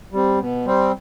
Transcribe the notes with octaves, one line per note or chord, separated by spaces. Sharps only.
G3 C4
B2
G3 C4